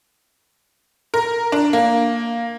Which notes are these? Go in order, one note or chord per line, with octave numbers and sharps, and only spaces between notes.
A#4
D4
A#3